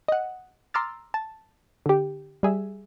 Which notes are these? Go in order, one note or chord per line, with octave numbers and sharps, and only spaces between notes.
D#5 F#5
A#5 C6 D6 E6 F6 A6
A5
D3 G4
G3 G#4 E5